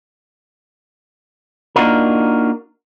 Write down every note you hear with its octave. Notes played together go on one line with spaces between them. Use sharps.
A#3 D4 D#4 F4 F#4 A#4